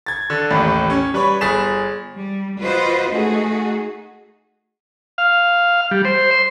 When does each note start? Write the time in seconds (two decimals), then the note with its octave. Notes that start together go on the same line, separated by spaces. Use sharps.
0.06 G#6 A6
0.30 D3
0.51 A1 D#2 A2
0.90 C#4
1.14 G3 B4 C#5 B5 C#6
1.41 G1 G#4 A6 B6 E7
2.16 G3
2.59 F4 F#4 B4 C5 D#5
3.12 A3 D#4 F#4 G#4
5.18 F5
5.91 G3
6.05 C5
6.31 C6